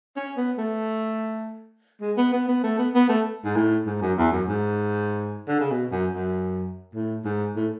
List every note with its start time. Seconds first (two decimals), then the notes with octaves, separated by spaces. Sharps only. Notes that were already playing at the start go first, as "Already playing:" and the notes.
0.17 C#4
0.37 B3
0.58 A3
2.01 G#3
2.17 B3
2.33 B3
2.48 B3
2.63 A3
2.79 B3
2.94 B3
3.09 A3
3.45 G#2
3.56 A2
3.86 G#2
4.02 F#2
4.18 E2
4.32 F#2
4.49 G#2
5.48 D3
5.60 C#3
5.71 B2
5.92 F#2
6.13 F#2
6.95 A2
7.25 G#2
7.56 A2